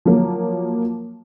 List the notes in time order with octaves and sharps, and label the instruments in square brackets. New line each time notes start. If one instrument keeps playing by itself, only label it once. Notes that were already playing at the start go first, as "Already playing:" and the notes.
[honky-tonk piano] F3 F#3 A#3